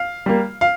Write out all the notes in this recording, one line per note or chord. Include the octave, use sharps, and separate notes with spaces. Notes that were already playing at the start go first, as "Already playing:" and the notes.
Already playing: F5
G3 A#3
F5